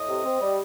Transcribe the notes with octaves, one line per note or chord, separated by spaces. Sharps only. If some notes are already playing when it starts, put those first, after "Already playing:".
Already playing: A2 D#5
C3
C4
G3